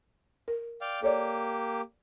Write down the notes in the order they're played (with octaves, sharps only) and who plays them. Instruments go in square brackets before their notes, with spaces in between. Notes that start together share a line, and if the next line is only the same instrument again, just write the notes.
[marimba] A#4
[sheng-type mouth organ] D5 F5 G5
[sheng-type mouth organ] A#3 G4 [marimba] A4 C#5 D5